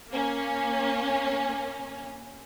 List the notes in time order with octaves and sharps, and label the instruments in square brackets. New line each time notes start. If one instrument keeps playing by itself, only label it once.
[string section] A#3 C#4